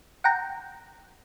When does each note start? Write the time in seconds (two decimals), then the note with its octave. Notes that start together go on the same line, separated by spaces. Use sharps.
0.24 F#5 G5 A#5